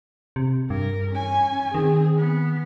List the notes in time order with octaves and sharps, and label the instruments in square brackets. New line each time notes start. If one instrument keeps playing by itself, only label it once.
[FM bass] C3
[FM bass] G2 [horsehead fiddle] A#4
[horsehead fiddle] C#4 G#5
[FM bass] D#3 [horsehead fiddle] C4 G#4
[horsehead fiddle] B3